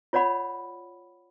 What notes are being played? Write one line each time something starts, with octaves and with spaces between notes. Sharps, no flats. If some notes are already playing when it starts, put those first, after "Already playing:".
F4 C#5 D5 F#5 B5